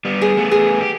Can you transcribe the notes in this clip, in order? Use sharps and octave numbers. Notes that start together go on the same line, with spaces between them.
G3 B3
G#4
A3 B3
G#4
G4